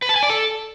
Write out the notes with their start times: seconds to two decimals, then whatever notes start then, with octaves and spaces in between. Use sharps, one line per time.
0.02 B4
0.09 A5
0.16 G#5
0.23 D5
0.29 A4